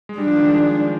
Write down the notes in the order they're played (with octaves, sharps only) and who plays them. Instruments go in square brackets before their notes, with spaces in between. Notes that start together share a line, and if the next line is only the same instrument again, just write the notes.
[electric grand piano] G#3
[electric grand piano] G3 [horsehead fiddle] D4
[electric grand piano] F3
D#3
G#3